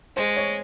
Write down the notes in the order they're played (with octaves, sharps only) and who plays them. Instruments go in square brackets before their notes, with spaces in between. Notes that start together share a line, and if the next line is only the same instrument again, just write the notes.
[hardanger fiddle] G#3 [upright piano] C5
[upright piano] C#5